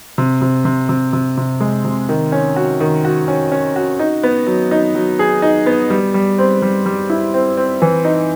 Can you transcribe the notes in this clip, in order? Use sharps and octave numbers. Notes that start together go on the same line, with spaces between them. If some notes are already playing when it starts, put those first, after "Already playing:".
C3
C3
C3
C3
C3
C3
G#3
C3
D#3
C#4
F#4
D#3
F#4
C#4
C#4
F#4
D#4
B3
F#3
D#4
F#3
G#4
D#4
B3
G3
G3
C4
G3
G3
E4
C4
C4
E3
D#4